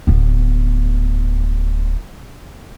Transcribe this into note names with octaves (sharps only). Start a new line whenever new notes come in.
D1 B3